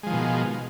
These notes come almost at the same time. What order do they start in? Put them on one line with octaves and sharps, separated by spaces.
G#3 F3 D#3 B2